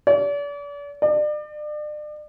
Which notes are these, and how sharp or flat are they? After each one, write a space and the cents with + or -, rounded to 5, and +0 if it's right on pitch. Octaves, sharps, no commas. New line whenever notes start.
D5 -40
D5 +35